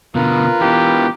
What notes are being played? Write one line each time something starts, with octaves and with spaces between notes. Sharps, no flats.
B2 D3 F4 A#4 B4
B2 E3 G4